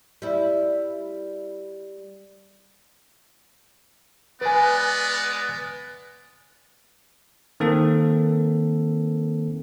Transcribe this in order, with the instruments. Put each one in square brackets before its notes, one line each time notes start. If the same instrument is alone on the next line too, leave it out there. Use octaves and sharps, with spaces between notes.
[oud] G3 E4
[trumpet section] G#3 B3 D5 [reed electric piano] B4 G#5
[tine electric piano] D#3 A#3 C4 A4